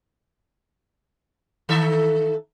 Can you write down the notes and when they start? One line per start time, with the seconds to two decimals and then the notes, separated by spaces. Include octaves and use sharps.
1.69 D#3 A4 E5